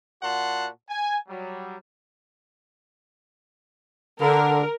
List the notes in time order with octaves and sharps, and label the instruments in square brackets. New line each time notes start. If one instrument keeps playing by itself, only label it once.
[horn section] A#2 F#4 F#5 A5 C6
G#5
F#3 G3
[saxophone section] D3 [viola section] A#4